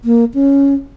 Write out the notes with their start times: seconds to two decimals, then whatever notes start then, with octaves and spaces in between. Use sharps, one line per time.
0.05 A#3
0.34 C#4